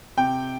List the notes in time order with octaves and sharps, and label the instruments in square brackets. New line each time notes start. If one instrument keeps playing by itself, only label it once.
[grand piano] C3 G5